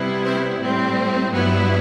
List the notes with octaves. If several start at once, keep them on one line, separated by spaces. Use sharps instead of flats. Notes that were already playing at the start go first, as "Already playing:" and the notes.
Already playing: C3 G3 B3 E4
C4 C5
A2 G3 C4
G2 F#3 B3 E4